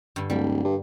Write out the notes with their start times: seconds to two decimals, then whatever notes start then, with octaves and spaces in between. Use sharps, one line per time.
0.16 G2 D3
0.30 D1 G3 A#3
0.65 G2